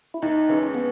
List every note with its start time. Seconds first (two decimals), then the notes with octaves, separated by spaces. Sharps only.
0.14 E4
0.22 D#2 D#4
0.49 C#3 E3 G#3 C#4
0.75 B3